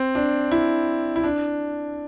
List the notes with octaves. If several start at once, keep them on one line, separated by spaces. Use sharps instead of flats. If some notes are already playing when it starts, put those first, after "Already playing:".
Already playing: C4
D4
E4
E4
D4